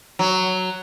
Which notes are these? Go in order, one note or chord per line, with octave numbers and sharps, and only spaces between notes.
F#3